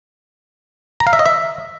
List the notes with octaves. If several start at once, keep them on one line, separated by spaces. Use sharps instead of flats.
A#5
F5
E5
D#5
E5